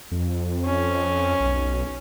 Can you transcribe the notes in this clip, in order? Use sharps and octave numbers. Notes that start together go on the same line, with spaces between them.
F2
C#4
B1